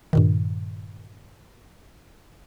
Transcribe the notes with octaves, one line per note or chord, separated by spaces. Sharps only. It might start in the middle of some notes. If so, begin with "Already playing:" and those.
G2 A#2 D#3